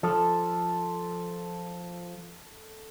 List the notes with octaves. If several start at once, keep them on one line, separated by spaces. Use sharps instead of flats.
F3 A4